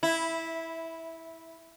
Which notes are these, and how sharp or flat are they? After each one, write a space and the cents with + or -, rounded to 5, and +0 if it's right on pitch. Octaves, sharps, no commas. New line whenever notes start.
E4 -10